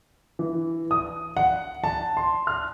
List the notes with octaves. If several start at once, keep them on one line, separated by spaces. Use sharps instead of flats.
E3
D#6
F#5
A5
C6
F6